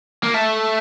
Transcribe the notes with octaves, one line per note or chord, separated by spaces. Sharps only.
A#3
A3